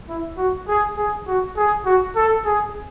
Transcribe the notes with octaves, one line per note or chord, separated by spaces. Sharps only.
E4
F#4
G#4
G#4
F#4
G#4
F#4
A4
G#4